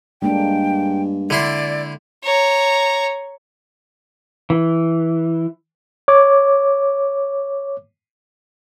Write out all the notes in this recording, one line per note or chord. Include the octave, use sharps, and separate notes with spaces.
G2 G#3 A#3 D4 G5
D3 E4 D5 C6
C#5 A#5
E3
C#5 D6